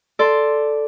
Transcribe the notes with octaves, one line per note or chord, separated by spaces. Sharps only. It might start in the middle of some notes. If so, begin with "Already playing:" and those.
A4 D5 C6